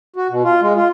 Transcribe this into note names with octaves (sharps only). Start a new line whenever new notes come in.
F#4
B2
F4
G#3
F4